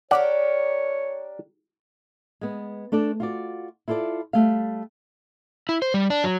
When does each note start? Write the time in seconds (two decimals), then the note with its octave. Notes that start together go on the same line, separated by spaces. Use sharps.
0.11 D4 G4 A#4 C#5 D5 F#5
2.41 G#3 B3
2.92 A3 D4 A4 D5
3.20 F4 F#4 D5
3.88 E4 F4 A4 C#5 D5
4.33 G3 A3 F5
5.69 E4
5.82 C5
5.94 G3
6.10 D4
6.24 F#3